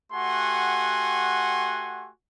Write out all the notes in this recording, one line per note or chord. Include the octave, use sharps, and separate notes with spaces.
A3 F#4 G4 F#5 G#5 C6